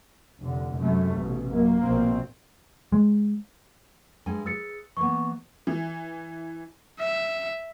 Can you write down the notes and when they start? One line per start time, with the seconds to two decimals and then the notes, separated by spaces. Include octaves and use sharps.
0.41 F1 D3
0.77 F#2 C3 A3
1.16 A1 B2
1.52 F#2 A#3
1.82 A#1 B2 C4
2.92 G#3
4.26 G2 G#3 G#5
4.46 G#4 B4 E6 A6 C#7
4.97 E3 A#3 B3 C#6
5.67 E3
7.00 E5